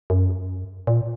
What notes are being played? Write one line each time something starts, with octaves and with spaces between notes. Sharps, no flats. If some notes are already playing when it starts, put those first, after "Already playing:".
F#2
A#2